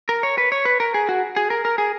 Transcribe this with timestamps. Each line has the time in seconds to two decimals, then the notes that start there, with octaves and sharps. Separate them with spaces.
0.09 A#4
0.23 C#5
0.38 B4
0.52 C#5
0.65 B4
0.80 A#4
0.94 G#4
1.09 F#4
1.36 G#4
1.50 A#4
1.65 A#4
1.78 G#4